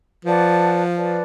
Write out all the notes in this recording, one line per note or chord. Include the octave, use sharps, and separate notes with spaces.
F3 B4 D5 F#5 A5
B4 D5 F#5 A5